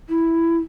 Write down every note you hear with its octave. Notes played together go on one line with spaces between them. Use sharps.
E4